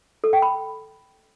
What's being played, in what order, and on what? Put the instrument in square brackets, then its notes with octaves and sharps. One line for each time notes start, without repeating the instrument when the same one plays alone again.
[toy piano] A4
G5
B5